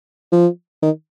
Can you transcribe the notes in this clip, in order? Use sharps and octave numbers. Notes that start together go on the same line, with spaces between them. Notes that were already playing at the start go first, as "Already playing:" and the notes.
F3
D#3